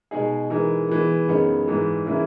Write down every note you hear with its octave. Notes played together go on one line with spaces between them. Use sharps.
B2 G#3 D#4 G#4
E3 G#3 D#4 A#4
E3 G#3 B3
F#2 C#3 G#3 B3 D#4
G#2 E3 G#3
C#3 E3 A#3 E4